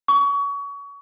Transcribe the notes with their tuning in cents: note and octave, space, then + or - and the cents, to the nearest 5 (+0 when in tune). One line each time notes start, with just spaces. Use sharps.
C#6 +30